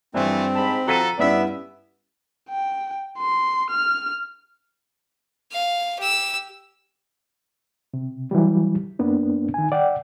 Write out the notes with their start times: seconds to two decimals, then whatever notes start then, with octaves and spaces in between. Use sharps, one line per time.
0.14 G2 E3 F3 A3 C4
0.56 G#2 A5 B5
0.88 F3 F#4 A4 A#5 B6 D#7
1.19 G2 B3 C#4 E4 D5 E5
2.50 G5
3.18 C6
3.70 F6
5.52 F5
6.00 G4 E6
7.94 C3
8.31 E3 F#3 G3
8.99 F#2 A#3 B3 D4
9.54 D#3 G#5
9.72 D5 F#5 G5